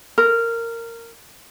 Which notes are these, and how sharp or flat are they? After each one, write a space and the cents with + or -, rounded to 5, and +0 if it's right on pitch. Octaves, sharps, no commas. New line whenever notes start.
A#4 -15